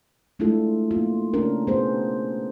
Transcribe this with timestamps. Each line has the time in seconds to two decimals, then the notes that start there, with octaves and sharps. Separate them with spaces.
0.39 G#3 A3 D4 E4 F4 A4
0.91 A#3 F4
1.34 A3 C#4 D4 A#4
1.67 B3 G#4 C5